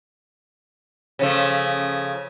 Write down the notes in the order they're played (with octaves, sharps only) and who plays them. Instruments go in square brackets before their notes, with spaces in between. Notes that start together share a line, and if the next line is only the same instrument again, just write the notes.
[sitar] C#3 F3 A3